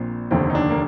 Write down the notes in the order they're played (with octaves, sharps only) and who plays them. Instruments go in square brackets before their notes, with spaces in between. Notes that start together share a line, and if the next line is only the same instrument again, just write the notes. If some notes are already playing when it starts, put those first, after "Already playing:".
Already playing: [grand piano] A#1 A#2 C4
F1 D#2 D3 C4
D#4
D4
A#3